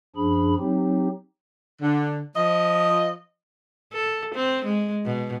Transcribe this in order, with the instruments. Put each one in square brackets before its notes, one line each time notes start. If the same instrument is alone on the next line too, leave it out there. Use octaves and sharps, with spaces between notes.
[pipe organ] F#2 F3 D4 G#4 B5
F#3 C4 D#4 G4
[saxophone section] D3
F3 D#5
[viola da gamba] A4
C4
G#3
B2